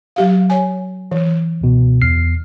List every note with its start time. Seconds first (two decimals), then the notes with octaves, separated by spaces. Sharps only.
0.16 F#3 G4 F5
0.50 C#5 G#5
1.11 E3
1.61 C#2 B2
2.02 E2 F6 C7